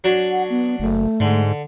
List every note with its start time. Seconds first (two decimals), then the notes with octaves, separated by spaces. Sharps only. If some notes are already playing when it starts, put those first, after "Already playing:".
0.04 F#3 D4
0.31 F#5
0.50 B3
0.80 F#1 A3
1.20 G#2 D3